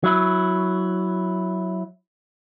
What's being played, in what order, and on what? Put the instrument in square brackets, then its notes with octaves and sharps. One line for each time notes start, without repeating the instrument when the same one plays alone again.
[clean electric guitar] F#3 E4